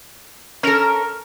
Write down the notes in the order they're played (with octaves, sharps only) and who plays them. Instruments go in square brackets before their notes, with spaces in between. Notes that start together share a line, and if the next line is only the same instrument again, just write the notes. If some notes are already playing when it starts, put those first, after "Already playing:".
[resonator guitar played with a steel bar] C#4 A4 [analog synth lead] A#4